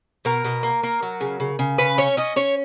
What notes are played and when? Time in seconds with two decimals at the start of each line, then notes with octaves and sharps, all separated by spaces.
0.25 B2 A#4
0.44 B2
0.63 A#3
0.83 A#3
1.02 F#3
1.21 C#3
1.40 C#3
1.59 C#3
1.78 C#4 B4
1.98 C#4 C#5
2.17 C#4 D#5
2.36 C#4 C#5